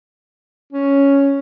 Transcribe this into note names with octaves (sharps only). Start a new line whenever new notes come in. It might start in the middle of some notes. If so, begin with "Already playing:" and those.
C#4